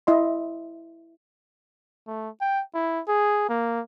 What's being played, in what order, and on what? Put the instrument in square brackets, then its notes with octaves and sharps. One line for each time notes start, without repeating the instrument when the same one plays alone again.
[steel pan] E4 D#5 C6
[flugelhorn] A3
G5
E4
G#4
A#3